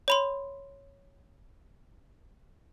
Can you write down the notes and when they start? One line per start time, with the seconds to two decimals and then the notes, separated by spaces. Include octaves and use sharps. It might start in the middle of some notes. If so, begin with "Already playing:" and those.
0.08 C#5 B5 C6